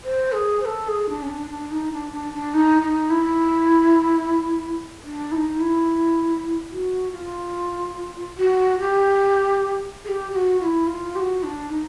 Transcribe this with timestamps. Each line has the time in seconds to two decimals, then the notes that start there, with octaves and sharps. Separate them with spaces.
0.04 C5
0.32 G#4
0.61 C5
0.65 A4
0.88 G#4
1.09 D4
1.22 C#4
1.29 D4
1.50 D4
1.71 D#4
1.92 D4
2.13 D4
2.34 D4
2.54 D#4
2.82 D#4
3.10 E4
5.04 D4
5.32 E4
5.35 D#4
5.60 E4
6.71 F#4
7.12 F4
8.38 F#4
8.79 G4
10.05 G#4
10.08 G4
10.32 G4
10.35 F#4
10.60 F4
10.64 E4
10.87 F4
11.16 G4
11.20 F#4
11.43 D4
11.70 D#4